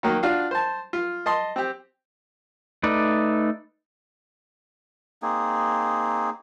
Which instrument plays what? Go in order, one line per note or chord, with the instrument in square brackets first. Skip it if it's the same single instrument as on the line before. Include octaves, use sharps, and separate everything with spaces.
[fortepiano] D#3 F#3 A#3
D4 F4 F#4 F5
C5 A5
F4
D#5 A5 C6
C4 G4
[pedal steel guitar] A3 D#4 B4 D5
[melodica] A#3 C4 D#4 G#4